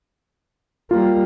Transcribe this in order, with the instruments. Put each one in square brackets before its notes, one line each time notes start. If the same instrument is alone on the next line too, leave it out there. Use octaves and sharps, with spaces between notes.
[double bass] G3 A#3 [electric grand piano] F4